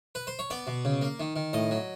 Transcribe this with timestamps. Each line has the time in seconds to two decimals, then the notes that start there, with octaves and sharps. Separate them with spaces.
0.15 B4
0.27 C5
0.39 C#5
0.50 B3 D5
0.67 B2
0.85 C#3
1.02 A#3
1.20 D#3
1.36 D#3
1.53 A2 D#5
1.71 F#3